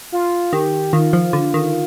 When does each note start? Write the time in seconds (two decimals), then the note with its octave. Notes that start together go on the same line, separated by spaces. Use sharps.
0.12 F4
0.53 D#3 G4
0.93 D#3 F4
1.13 F3
1.33 D3
1.54 D#3